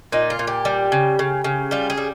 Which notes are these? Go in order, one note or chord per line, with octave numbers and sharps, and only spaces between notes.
A#2 D#4
F4
A#2
G4
G3
C#3
C#3
C#3
G3 F4
G#4
G3